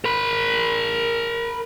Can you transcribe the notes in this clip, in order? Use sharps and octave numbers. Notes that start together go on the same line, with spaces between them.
A#4 B5